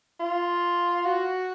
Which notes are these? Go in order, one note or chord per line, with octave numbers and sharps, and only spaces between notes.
F4
F#4